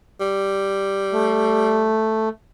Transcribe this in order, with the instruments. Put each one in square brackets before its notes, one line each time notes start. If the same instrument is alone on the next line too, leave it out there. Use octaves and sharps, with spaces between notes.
[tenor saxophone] G3
[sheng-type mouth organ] A3